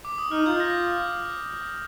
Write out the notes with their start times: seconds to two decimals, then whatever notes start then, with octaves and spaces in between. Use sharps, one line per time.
0.05 D6
0.18 D#6
0.31 D#4 F6
0.46 F4 G6
0.60 A#6